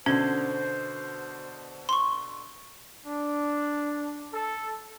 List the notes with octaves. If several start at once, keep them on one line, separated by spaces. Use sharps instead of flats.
B2 D3 C#4 C5 G#6 G7
C6 C#6
D4
A4